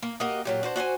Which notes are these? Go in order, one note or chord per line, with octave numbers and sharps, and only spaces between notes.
A#3
A#3 F#4 G4 D#5
A#2 F#3 G4
D4 F#4 C5
F#4 C5 D5 G#5